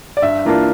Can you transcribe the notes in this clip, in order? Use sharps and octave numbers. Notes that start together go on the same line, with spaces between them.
D5
G2 E5
E3 A#3 D4 F4